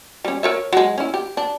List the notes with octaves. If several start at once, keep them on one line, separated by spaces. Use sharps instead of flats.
G3 C#4
A#4 C#5 E5
F#3 G#3
C#4 E4
G4
D4